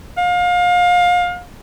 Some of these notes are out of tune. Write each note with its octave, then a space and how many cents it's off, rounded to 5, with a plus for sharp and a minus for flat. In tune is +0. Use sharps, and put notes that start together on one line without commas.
F5 +30